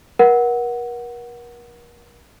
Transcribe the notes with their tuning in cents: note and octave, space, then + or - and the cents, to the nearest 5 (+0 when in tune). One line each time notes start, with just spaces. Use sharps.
A#4 +40 F#5 +0